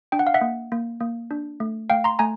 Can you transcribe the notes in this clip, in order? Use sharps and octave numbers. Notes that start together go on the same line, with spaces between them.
D4 G5
F#5
F5
E5 F#5
A#3
A#3
A#3
D4
A3
A3 F5 G5
A#5 C6
A3 G#5 A#5